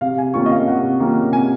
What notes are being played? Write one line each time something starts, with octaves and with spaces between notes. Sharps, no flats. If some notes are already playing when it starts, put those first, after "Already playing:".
C3 F5
G#5
D#3 A#3 C#4 F4 C#6
D#5
F5
C3 F#5
D#3 A#3 C#4 F4
C3 G#5